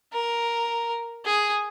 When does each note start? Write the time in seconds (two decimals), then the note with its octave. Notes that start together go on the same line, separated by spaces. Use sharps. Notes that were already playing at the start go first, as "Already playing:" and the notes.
0.13 A#4
1.25 G#4